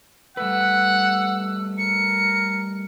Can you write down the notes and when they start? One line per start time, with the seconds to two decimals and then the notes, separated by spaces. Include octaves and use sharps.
0.37 G3 A3 B4 F#5 E6
1.78 A#4 C#7